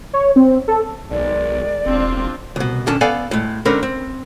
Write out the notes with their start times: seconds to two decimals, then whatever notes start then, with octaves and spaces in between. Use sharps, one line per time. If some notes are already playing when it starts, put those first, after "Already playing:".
0.13 C#5
0.36 C4
0.68 A4
1.11 B1 D#3 G#3 D5
1.86 E1 C4 D4 F4
2.56 C2 B2
2.87 B1 D3 D#3 C#4 A5
3.01 B3 A4 D5 F5 F#5 G#5
3.31 A2 G#3
3.65 G#2 D3 C4 C#4 A#4 B5
3.83 C4